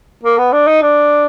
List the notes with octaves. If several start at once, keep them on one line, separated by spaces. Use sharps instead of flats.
A#3
B3
D4
D#4
D4